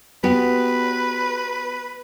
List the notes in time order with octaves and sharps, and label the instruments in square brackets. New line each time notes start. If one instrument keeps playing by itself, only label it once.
[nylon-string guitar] B3 F#4 G4 [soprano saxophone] B4